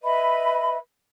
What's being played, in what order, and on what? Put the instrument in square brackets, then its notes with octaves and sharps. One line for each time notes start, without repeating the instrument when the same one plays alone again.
[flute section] B4 D#5 E5 B5